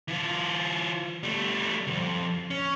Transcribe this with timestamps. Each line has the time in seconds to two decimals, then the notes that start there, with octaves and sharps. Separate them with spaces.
0.08 E3 F4
1.23 G3 A3
1.87 C2 F2
2.50 C#4